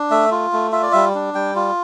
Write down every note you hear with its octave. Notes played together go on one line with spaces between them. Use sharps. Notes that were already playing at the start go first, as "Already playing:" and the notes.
Already playing: D4
A3 E5
F4
A3
F4 E5
D5
G3 E5
D4
G3 G5
F4